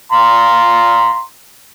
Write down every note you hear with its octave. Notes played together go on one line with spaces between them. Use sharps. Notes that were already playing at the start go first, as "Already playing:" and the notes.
F5 A#5 C6